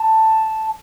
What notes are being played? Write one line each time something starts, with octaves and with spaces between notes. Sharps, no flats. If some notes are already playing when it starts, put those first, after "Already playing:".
Already playing: A5